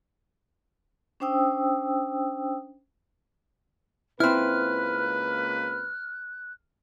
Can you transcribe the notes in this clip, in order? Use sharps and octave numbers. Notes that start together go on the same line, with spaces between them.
C#4 D4 C5 G5 D#6 E6
C#2 A#3 C4 E4 B4 F6 F#6